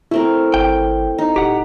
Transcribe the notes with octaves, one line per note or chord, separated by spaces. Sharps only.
A3 C4 E4 A#4
G#1 G5
D#4
D1 G4 F#5